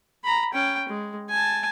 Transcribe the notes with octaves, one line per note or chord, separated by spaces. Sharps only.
A#5 B5
C#4 G5
G#3
G#5 A5